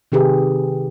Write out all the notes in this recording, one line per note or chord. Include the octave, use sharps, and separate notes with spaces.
C3 D#3 G4 G#4 B4